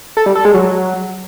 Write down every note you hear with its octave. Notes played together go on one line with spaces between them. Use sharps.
A4
G3
A4
G#3
F#3